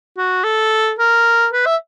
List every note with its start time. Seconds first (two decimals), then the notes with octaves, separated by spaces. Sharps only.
0.18 F#4
0.44 A4
0.99 A#4
1.53 B4
1.66 E5